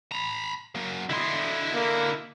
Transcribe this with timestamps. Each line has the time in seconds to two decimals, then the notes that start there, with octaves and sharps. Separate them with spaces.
0.12 A#5 B5
0.75 F#3 A#3
1.10 D3 E4 D#5 C6
1.74 A#3